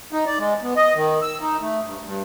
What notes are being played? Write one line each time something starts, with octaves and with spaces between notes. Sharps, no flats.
D#4
D5
G#3
B3
D#5
D#3
E6
D#4
A3
G2
G2